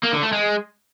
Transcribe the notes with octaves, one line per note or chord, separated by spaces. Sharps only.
A#3
D3
A3
G#3